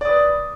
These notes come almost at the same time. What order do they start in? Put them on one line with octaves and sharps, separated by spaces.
D5 D#6 B4